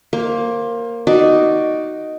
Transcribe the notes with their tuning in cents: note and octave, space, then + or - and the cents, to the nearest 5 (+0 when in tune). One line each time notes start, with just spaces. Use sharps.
A#3 +0 C5 +25
D#4 +0 F#4 +5 D5 +0